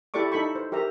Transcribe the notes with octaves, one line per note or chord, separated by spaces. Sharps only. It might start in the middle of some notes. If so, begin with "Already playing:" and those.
E4 G4 A4 D5 C#6 D6
D#4 A4 B5 C#6
C5
G4 A#4 E5 A#5